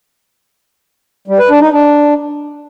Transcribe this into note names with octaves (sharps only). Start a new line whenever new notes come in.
G3
B4
D4
D#4
D4